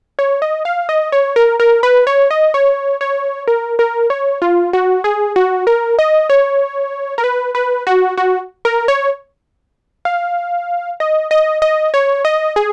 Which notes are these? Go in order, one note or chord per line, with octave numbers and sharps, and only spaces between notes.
C#5
D#5
F5
D#5
C#5
A#4
A#4
B4
C#5
D#5
C#5
C#5
A#4
A#4
C#5
F4
F#4
G#4
F#4
A#4
D#5
C#5
A#4
B4
B4
F#4
F#4
A#4
C#5
F5
D#5
D#5
D#5
C#5
D#5
G#4